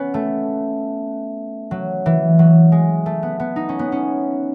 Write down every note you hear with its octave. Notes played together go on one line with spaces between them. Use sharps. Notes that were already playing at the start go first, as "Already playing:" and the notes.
Already playing: B3 C#4
A3
F#3
E3
F#3
G#3
A3
B3
B3
D#4
C#4
B3
C#4